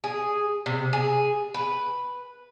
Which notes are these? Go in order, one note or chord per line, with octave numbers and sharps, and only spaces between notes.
G#4
C3
G#4
B4